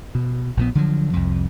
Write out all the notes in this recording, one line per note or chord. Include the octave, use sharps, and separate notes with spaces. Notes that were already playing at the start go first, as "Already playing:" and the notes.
B2
A#1 A#2 B3
D3 F3 F#3
C2 F2